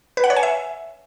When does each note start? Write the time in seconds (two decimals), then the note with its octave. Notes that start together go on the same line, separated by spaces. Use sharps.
0.17 B4
0.24 F#5
0.30 C#5
0.36 G#5
0.43 E5